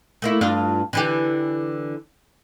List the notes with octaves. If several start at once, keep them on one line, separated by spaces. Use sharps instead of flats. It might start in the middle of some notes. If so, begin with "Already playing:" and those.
A3 A#3 E4
G2 D4 F4
D3 E3 G4